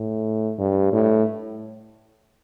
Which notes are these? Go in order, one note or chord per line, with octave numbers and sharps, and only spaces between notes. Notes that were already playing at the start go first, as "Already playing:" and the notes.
Already playing: A2
G2
A2